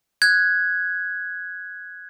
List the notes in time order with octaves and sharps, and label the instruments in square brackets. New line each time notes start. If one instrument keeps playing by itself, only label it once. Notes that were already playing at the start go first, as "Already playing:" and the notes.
[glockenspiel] F#6 G#6